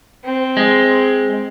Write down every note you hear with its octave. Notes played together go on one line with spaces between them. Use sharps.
C4
G#3